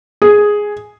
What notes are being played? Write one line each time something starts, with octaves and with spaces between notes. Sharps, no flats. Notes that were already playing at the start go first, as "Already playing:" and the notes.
G#4